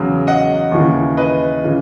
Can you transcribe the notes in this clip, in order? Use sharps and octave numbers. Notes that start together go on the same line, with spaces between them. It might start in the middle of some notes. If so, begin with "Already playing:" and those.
Already playing: E2 C#3 F#3
D#5 F#5
D#2 C#3 E3
B4 D#5
C#3 E3